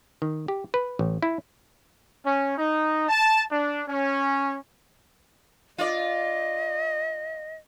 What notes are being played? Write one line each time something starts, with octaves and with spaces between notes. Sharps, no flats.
D#3
G4
B4
A1
E4
C#4
D#4
A5
D4
C#4
F4 D5 D#5